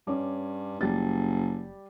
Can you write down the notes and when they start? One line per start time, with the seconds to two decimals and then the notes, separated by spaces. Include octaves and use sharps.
0.07 G2 C#4 D6
0.81 F#1 G3 G4 A6